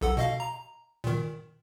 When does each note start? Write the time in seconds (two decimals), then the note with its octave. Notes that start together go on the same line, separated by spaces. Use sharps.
0.01 B1 A4 F#5
0.17 B2 D#5 F5
0.40 A#5
1.04 A#2 D#3